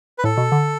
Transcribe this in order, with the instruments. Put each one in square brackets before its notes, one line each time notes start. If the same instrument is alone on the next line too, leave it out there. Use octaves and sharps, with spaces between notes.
[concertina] B4
[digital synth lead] A2 [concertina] A4
[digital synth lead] B2
D3